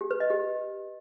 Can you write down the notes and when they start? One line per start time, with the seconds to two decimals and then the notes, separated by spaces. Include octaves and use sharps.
0.01 G4
0.11 B4
0.20 D#5
0.30 G4